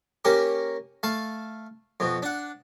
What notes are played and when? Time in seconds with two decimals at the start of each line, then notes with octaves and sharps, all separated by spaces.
0.25 A#3 C#4 G4 A#4
1.03 A3 F5 A5
2.00 F2 B2
2.22 D4 F#5